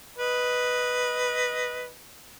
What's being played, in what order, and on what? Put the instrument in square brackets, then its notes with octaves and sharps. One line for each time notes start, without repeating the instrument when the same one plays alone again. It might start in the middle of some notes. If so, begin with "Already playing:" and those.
[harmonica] B4 D#5